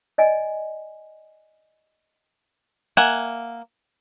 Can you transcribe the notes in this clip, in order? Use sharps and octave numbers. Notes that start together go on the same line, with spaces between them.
D5 D#5 G#5
A#3 E5 F#5 G#5